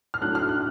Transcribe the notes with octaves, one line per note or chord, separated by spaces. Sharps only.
F6
A2 F#3 A3 D4 F#6
F6
F#6